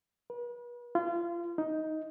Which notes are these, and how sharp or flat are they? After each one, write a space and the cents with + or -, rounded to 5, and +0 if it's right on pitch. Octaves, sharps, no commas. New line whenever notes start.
B4 -40
F4 -30
D#4 +10